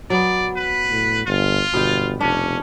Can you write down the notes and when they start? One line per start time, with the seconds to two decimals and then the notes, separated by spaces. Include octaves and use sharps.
0.10 F#3 B3 D5
0.57 B4
0.91 A2
1.27 G1 F4
1.74 G1 B2 G5
2.21 F1 C#4 D4